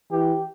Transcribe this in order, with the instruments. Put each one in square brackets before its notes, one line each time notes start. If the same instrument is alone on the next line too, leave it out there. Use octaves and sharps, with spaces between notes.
[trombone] E3 [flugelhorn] G4